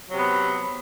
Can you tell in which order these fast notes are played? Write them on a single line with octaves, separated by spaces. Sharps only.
F#3 C3 B3